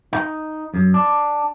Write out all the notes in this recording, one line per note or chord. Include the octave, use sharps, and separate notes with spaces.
D#4
F#2
D4